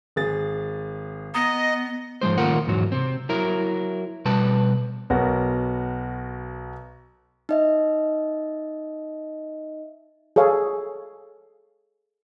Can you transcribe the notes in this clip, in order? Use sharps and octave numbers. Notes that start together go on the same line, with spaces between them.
G#1 G#4 A6
B3 D#5 A#5 D#6
G#2 F3 G#3 C5
A#2 D#3 A3 F4 A#4 F#5
E2 G#2 F#3
C3 C4
F#3 E4 A#4
B2 G3 B4 A5
B1 B3 F#4 A#4
D#4 D#5 E5
G#4 A4 C#5 F5